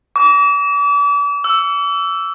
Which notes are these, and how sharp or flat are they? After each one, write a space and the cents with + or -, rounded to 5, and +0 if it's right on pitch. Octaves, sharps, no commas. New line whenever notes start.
D6 -40
E6 +5